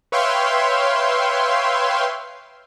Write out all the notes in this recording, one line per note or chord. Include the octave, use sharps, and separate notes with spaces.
B4 C#5 E5 F5 G5 C6